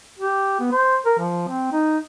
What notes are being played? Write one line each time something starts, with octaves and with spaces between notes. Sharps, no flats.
G4
B3
C5
A#4
F3
C4
D#4